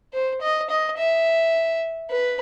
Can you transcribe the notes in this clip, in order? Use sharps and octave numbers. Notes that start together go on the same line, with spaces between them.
C5
D#5
D#5
E5
B4